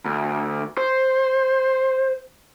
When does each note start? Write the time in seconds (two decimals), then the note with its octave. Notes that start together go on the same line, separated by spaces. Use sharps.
0.05 D2
0.78 C5